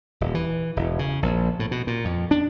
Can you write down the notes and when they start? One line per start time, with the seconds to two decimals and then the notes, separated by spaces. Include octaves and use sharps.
0.21 D#1
0.35 E3
0.76 E1
0.99 C#3
1.23 A#1
1.59 A2
1.71 B2
1.87 A#2
2.05 F2
2.31 D4